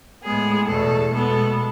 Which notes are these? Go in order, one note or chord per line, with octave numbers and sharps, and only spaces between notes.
A2 G#3 B3 G#4
E2 B2 A3 A4
B2 G#3 B3 A4